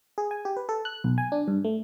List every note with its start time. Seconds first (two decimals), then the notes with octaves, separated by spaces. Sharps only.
0.18 G#4
0.31 G#5
0.45 G4
0.57 B4
0.69 A4
0.85 F#6
1.04 B1
1.18 G#5
1.32 D4
1.48 G2
1.64 A3